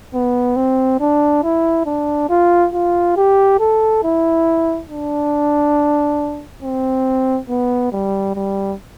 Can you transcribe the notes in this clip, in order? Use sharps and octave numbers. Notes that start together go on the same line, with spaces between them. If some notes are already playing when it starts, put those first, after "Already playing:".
B3
C4
D4
E4
D4
F4
F4
G4
A4
E4
D4
C4
B3
G3
G3